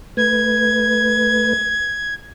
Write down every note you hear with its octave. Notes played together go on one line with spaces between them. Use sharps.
A3 B4 G#6